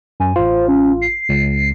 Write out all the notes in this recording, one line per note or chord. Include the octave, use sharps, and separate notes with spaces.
F#2 G#5
A1 F4 C5
C#4
C7
C#2